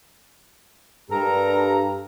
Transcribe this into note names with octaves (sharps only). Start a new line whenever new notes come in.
G2 G4 A4 A#4 A#5